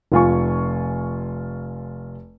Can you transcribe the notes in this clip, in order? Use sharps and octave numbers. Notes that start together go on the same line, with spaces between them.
F1 F4 G#5 C#6